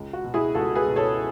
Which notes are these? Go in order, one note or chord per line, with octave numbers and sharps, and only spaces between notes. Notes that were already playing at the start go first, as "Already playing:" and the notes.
Already playing: C#2
F#4
B2
E4 G#4
C#2 F#4 A4
G#4 B4
B2
A4 C#5